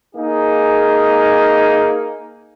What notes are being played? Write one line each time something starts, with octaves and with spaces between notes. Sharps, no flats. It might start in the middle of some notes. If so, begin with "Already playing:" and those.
A#3 D#4 G#4